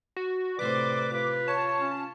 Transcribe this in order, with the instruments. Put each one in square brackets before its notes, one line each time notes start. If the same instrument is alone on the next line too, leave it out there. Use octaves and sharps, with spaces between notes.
[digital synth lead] F#4
[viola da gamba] A2 C3 C5 [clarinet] B4 [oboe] D5 [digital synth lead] D6
[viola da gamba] F4 [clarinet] B4
[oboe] C#5 [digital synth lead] A5
[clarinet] C#4